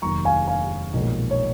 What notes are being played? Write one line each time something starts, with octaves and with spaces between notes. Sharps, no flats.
F1 D#2 D#3 F#3 A#5 C#6
F5 G#5
F5 G#5
B1 A#2 F3 G#3
C#5